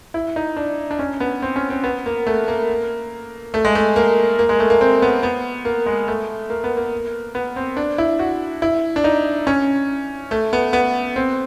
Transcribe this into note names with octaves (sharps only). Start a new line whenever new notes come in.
E4
D#4
D4
D4
C#4
B3
C4
C#4
C4
B3
A#3
A3
A#3
A3
G#3
A3
A#3
A#3
G#3
A3
A#3
C4
B3
B3
A#3
G#3
A3
A#3
B3
A#3
B3
C4
D4
E4
F#4
E4
D4
D#4
C#4
A3
B3
B3
C4